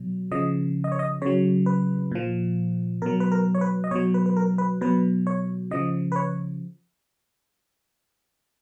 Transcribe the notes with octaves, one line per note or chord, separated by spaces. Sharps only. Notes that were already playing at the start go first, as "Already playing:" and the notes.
Already playing: B2 F#3
C#3 F3 D#5
D#5
C#5
D#5
C#3 F#3 C#5
B4
A#2 F3
B2 F#3 A#4
B4
A#4
C#5
B4
D#5
B2 F#3 C#5
B4
B4
A#4
B4
B2 F#3 B4
C#5
C#3 F3 D#5
B4
C#5